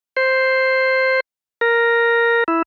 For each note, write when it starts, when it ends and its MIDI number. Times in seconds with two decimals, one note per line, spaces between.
0.17 1.20 72
1.61 2.44 70
2.48 2.62 64